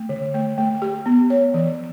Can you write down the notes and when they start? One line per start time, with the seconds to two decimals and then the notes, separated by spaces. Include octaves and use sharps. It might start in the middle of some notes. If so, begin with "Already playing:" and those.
Already playing: A3
0.09 D3
0.34 A3
0.58 A3
0.82 G4
1.06 B3
1.30 C#5
1.54 E3